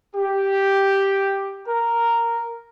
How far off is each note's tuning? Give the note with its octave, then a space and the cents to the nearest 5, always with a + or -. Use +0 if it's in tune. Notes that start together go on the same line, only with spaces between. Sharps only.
G4 +0
A#4 -5